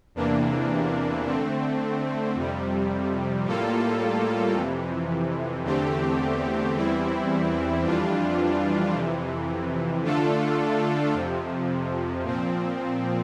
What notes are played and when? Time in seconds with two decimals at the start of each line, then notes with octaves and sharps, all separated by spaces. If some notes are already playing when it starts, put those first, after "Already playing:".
0.15 E2 C3 E3 A#3 D4
1.25 D3 A3 C4
2.35 F2 C3 G3
3.44 A2 G3 A#3 F4 A4
4.55 F2 C3 E3
5.64 E2 D3 A3 C4 G4
6.75 E2 E3 G3 C4 E4
7.84 F2 E3 G3 D4 F4
8.93 F2 C3 E3
10.04 D3 A3 D4 F4 A4
11.13 F2 C3 F3
12.24 A#2 F3 C4